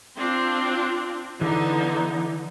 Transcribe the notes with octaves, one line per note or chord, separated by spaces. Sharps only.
C4 D4 F4
D3 E3 B3 D#4